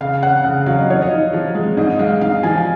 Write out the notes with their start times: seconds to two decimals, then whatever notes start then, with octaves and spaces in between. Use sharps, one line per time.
0.01 C#3 F5
0.23 C#4 F#5
0.44 C#3 F#5
0.66 F#3 F5
0.79 D#5
0.89 F3 C#5
1.02 D#5
1.11 D#4
1.33 F3
1.55 G#3
1.77 G#2 D#5
1.99 G#3 F5
2.21 G#2 F5
2.43 F3 G#5